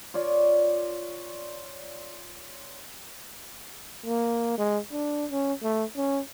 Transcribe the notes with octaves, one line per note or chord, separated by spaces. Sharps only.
F4 C#5 D5
A#3
G#3
D4
C#4
A3
C#4